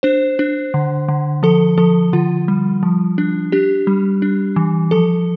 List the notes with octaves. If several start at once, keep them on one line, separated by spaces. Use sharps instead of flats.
D4 C5
D4
D3
D3
F3 A4
F3 A4
D3 F4
G3
F3
D4
D4 G4
G3
D4
E3
F3 A4